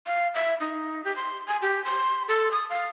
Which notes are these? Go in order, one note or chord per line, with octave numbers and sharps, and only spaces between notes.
F5
E5
D#4
G4
C6
G#5
G4
C6
A4
D#6
F5